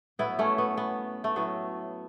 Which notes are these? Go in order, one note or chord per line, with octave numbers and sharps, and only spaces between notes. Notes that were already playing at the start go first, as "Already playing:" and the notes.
A2 F#3 B3 E4
A3 C#4
B3
B3
A3
A2 F#3 B3